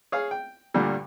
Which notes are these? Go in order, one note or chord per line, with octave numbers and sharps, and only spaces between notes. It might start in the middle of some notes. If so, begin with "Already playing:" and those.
G#4 C#5 F5 F6
G5
D2 G2 A#2 D3 G3